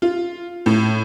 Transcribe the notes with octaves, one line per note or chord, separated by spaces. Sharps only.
F4
A2